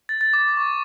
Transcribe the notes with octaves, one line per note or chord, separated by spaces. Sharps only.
A6
A6
D6
C#6